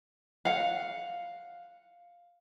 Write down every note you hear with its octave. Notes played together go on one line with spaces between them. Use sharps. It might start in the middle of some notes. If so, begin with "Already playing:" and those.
F5 F#5